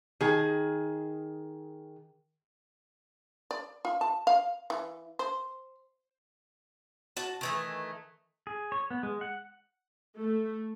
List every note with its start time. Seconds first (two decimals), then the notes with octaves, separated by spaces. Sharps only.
0.21 D#3 G#4
3.51 D5
3.85 F4
4.01 A5
4.27 F5
4.70 E3
5.19 C5
7.17 F#4 A5
7.41 D#3 E3 A3
8.47 G#4
8.72 C#5
8.91 B3
9.03 G#3
9.21 F#5
10.18 A3